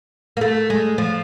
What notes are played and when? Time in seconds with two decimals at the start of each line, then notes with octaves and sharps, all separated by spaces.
0.37 A#3
0.41 A3
0.70 G#3
0.98 F3